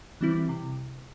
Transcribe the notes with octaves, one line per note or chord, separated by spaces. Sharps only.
E3 G3 C4 E4
C3